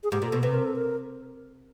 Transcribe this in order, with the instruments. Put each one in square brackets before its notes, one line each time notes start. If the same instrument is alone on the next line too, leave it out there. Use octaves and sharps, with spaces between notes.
[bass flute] G#4
[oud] G#2 [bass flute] G4
[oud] A#2
[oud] B2 [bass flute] A4
[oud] C3 [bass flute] B4
[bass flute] A#4
A4
A#4